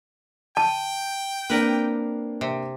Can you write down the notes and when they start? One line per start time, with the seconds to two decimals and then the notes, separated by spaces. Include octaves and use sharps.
0.57 G5 A5
1.50 A#3 C4 D4 A#4 B4
2.41 C3